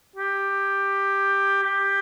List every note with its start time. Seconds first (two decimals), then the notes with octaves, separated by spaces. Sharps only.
0.16 G4
1.63 G4